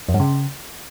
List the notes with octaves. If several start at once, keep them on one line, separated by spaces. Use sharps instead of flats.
F2
G2
C#3